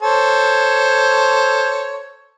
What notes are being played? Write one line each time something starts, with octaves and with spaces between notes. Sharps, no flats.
A4 C5 C#5